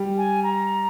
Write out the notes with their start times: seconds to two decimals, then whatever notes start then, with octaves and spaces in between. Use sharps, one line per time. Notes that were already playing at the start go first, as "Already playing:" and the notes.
Already playing: G3
0.17 G#5
0.43 A#5